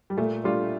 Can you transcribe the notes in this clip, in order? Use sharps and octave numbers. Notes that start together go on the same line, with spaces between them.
G3
A#2 A3
G3 A3 D4 F4